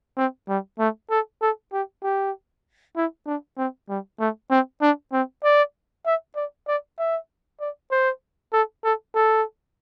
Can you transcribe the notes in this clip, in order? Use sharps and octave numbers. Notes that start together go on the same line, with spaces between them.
C4
G3
A3
A4
A4
G4
G4
E4
D4
C4
G3
A3
C4
D4
C4
D5
E5
D5
D5
E5
D5
C5
A4
A4
A4